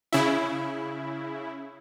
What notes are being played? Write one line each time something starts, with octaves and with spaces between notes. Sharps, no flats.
C#3 E4